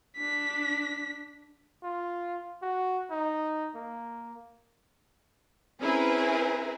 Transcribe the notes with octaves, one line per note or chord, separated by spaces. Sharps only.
D4 B6
F4
F#4
D#4
A#3
C4 C#4 E4 G#4 A#4 B4